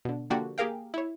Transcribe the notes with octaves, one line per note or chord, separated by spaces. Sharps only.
B2 D3
D3 F3 A#3 F#4 G4 D5
A#3 G4 G#4 A#4 F5 G5
E4 C#5